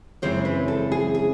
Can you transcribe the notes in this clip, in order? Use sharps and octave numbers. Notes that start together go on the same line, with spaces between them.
F#2 C#3 E3 G#3 C4 C5
B4
A4
G#4
G#4